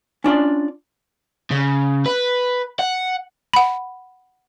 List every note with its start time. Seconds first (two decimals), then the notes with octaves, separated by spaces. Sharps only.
0.24 C#4 D4 F4 D5
1.51 C#3
2.06 B4
2.79 F#5
3.54 F#5 B5